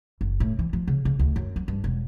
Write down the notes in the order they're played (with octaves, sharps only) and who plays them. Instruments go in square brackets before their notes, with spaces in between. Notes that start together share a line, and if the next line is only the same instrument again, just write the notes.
[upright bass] F#1
A2
E3
F3
C#3
C#3
D2
F#2
F#3
G2
E1